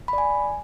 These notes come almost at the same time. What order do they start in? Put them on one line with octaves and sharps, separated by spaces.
B5 D5 G#5